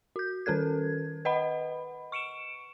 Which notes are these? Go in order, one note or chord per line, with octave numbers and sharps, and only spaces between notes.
F#4 G6
D#3 C#4 A4 A#4 G#6
B4 D#5 F#5 B5
C#6 C#7 D7 E7